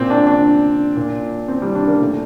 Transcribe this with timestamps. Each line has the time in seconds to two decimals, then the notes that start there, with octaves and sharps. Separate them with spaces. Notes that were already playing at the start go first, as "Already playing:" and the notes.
Already playing: A#2 C4
0.10 D4
0.27 D4
0.97 A#2
1.48 C4
1.62 G3
1.75 D4
1.88 A#3
2.01 A#2 A3